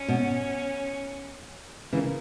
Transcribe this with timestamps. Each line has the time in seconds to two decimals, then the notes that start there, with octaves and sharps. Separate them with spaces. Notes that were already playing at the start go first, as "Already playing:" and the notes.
Already playing: C#4
0.08 B2
1.92 C#3 E3 A#3